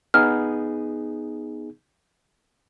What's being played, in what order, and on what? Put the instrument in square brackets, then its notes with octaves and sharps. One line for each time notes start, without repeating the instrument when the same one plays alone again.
[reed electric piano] B3 D#4 G#4 [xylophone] F6